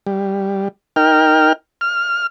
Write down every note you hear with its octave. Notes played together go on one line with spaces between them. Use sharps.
G3
D#4 A#4 G5 F6
F6